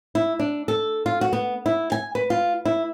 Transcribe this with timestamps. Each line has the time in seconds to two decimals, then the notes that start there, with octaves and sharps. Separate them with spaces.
0.15 E4
0.39 D4
0.68 A4
1.06 F4
1.21 F#4
1.33 B3
1.66 E4
1.92 G#5
2.15 B4
2.30 F4
2.65 E4